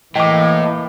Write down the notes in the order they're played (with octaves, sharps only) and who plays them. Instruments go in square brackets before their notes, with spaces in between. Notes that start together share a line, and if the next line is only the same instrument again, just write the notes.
[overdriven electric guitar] A2 [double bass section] E3 A#3 [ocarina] D#5 [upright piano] G5 D6